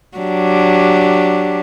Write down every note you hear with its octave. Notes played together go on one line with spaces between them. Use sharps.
F#3 D4 G4